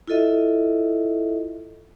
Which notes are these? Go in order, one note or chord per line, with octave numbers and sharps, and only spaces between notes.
E4 F4 A4 D#5 E5